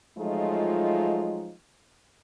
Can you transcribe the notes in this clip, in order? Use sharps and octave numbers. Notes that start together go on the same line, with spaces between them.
F3 F#3 G#3 A3 D#4 F4